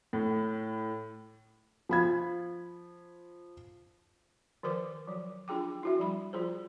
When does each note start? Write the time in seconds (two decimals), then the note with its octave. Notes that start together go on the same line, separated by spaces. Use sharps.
0.13 A2
1.89 F3 B5 G#6
4.63 D#3 F3 A#4 C5 D6
5.07 F3 F#3
5.48 D4 F4 G#4 G5 D6
5.83 E4 F#4 E5
5.99 F3 G3 B5
6.33 F3 F4 G#4 C5